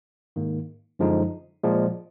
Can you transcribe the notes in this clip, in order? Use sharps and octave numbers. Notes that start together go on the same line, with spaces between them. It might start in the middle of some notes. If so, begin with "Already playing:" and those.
G#2 D#3 A#3
F#2 D3 F3 G#3 D#4
A#2 F3 G#3